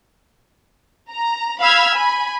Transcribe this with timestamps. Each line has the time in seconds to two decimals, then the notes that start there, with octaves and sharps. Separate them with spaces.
1.12 A#5
1.60 F5 B5 E6 F6 G#6 B6
1.94 G#5 B5